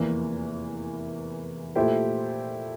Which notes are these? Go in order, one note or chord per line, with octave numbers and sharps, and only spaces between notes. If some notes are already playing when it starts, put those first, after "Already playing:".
Already playing: F1 E2 E3 A#3
A#2 A3 E4 G4 C5